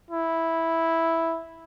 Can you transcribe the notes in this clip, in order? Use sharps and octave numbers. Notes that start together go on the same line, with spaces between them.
E4